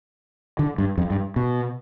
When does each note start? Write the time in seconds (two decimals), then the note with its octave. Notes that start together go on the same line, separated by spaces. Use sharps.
0.59 D3
0.78 G2
0.98 F2
1.10 G2
1.36 B2